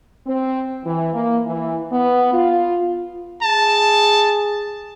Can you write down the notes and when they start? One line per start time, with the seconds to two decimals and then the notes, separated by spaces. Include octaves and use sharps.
0.27 C4
0.84 E3
1.14 A#3
1.47 E3
1.91 B3
2.33 F4
3.42 G#4 A5